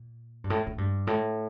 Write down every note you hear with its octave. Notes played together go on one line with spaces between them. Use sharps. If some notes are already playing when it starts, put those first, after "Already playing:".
Already playing: A#2
G2
A2
A2
G2
A2